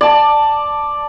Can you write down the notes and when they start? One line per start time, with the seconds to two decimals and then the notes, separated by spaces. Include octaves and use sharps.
0.01 D5 A5